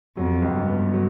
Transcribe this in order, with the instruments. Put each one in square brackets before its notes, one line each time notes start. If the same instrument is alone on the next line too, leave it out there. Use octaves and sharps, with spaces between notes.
[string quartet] F2 [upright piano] F#3
[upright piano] C#2
[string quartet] G2
[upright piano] B3
F#3